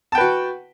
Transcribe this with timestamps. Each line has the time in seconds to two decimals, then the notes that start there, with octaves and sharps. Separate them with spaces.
0.12 A5
0.15 G5
0.18 B4
0.20 F#4